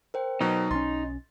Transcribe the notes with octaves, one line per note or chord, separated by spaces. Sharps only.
A#4 C5 G5
B2 F#3 D#4
B1 F#3 C#4 C6 A6